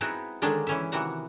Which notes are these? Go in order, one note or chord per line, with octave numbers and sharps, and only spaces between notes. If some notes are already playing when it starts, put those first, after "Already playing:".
G#3 B3 C4 D#4 E4 F#4
D3 D#3 G#3 C#4 D4
E3 C#4 E5
C3 D#3 E3 F#4 F#5